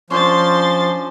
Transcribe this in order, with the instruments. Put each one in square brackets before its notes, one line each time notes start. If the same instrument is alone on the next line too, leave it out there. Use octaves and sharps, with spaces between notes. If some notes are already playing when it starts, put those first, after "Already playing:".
[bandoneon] F3 [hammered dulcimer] C#4 D4 C5 [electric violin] C6 A6